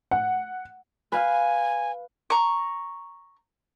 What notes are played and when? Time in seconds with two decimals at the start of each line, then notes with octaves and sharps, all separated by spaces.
0.11 F#5
1.12 B4 F5 G#5 F6
2.30 A#5 C#6